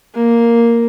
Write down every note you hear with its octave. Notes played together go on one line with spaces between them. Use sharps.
A#3